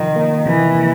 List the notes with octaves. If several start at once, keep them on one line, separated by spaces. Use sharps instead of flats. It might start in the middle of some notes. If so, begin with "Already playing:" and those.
Already playing: C3 D#3 F3
A#3
C3 E3
C3